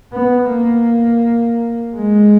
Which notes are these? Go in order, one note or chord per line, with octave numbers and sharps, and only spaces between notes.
B3
A#3
G#3